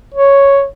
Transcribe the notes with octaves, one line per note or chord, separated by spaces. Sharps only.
C#5